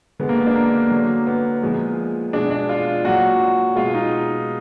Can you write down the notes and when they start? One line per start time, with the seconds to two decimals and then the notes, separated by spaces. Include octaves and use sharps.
0.19 D3 G#3 B3
0.29 A#3
0.37 B3
0.47 D4
0.56 A#3
0.91 D3 F#3
1.27 B3
1.63 A#2 F3 G#3
2.33 B2 G#3 D4
2.51 D4
2.69 F4
3.04 A#2 F#3 F#4
3.76 B2 G#3 F4
3.95 D#4